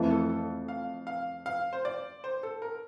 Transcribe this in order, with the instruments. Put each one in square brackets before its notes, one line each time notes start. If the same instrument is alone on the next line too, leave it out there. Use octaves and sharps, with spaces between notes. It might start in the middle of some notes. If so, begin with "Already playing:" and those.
Already playing: [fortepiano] F2 E3 A3
[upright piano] A4
A4
F5
F5
F5
C5
D5
C5
A4
A#4